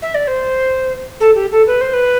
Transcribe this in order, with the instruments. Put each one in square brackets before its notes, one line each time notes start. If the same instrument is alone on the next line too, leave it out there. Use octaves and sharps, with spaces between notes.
[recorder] E5
D5
C5
A4
G4
A4
B4
C5
B4